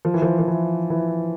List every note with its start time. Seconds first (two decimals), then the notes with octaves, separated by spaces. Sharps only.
0.05 F3
0.14 E3
0.22 F3
0.39 F3
0.48 E3
0.90 E3